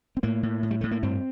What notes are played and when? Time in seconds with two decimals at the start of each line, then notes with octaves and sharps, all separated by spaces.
0.17 C4
0.23 A2 A#3
0.43 A2
0.63 A2
0.71 G3
0.81 A2 A3
0.91 A#3
1.03 G2 C4